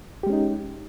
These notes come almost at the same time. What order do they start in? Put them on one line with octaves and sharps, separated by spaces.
G4 G#3 C#4 D#4